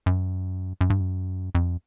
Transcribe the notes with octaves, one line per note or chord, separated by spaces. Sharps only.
F#2
F#2
G2
F#2
F2